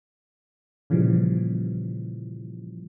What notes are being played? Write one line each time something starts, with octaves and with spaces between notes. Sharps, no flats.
A#2 C#3 E3 F3 G3